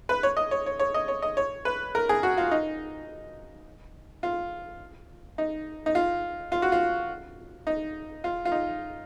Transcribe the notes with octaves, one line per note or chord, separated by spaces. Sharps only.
B4
C#5
D#5
C#5
C#5
C#5
D#5
C#5
D#5
C#5
B4
A#4
G#4
F#4
F4
D#4
F4
D#4
D#4
F4
F4
F#4
F4
D#4
F4
F4
D#4